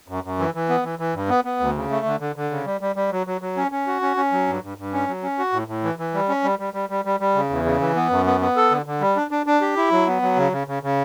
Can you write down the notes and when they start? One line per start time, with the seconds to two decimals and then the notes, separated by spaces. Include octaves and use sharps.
0.08 F#2
0.24 F#2
0.39 E3
0.54 E3
0.69 B3
0.84 E3
0.99 E3
1.15 G2
1.29 B3
1.44 B3
1.60 D2
1.75 C#3
1.90 A3
2.06 D3
2.20 D3
2.36 D3
2.51 C#3
2.66 G3
2.81 G3
2.96 G3
3.11 F#3
3.27 F#3
3.41 F#3
3.57 C#4
3.71 C#4
3.87 F#4
4.02 C#4
4.17 C#4
4.32 F#3
4.47 G2
4.62 G2
4.78 G2
4.93 C#4
5.08 F#3
5.23 C#4
5.39 F#4
5.53 A2
5.68 A2
5.84 E3
5.99 E3
6.14 G3
6.29 C#4
6.44 G3
6.59 G3
6.74 G3
6.89 G3
7.05 G3
7.20 G3
7.35 C#3
7.50 E2
7.65 C#3
7.80 E3
7.96 B3
8.10 F#2
8.26 B3
8.41 B3
8.56 A4
8.71 D3
8.86 D3
9.01 G3
9.16 D4
9.31 D4
9.46 D4
9.61 G4
9.77 E4
9.92 F#3
10.07 B3
10.22 F#3
10.37 C#3
10.52 C#3
10.67 C#3
10.83 C#3